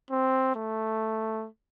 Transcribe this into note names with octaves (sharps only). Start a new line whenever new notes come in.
C4
A3